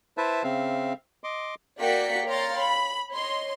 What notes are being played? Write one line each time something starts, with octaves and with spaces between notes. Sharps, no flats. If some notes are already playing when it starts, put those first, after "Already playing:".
E4 B4 C5 E5 A5
C#3 C4 E5 F5
D#5 C6 D6
A#3 F#4 D5 G5 B6 C#7
C#5 F5 G5 A#5 C6 A6
B5
C#5 D#5 C6